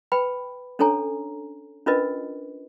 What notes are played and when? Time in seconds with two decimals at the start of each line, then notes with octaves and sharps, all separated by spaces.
0.12 B4 G5 B5
0.79 C#4 D4 A4 C#5 G#5 A#5
1.86 C#4 D4 F4 A#4 B4 D#5